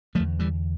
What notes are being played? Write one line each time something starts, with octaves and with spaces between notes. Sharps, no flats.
E2 D3 F3 A3
E3 G3